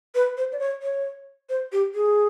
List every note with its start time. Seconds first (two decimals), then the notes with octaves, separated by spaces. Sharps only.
0.15 B4
0.37 C5
0.52 D5
0.59 C#5
0.83 C#5
1.49 C5
1.72 G4
1.95 G#4